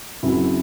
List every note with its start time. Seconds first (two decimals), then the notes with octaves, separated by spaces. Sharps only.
0.23 F#1 F#2 F#3 C4 E4